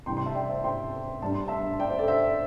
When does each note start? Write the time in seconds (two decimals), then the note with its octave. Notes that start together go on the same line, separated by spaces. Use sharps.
0.06 C3 E3 G3 G5 C6
0.17 G5 C6
0.26 E5 A5
0.35 D5 G5
0.50 C5 E5
0.64 G5 C6
1.22 G2 G3 A5
1.34 C6
1.48 E5 A5
1.79 D5 G5
1.88 C5 E5
1.99 A4 D5
2.07 C5 E5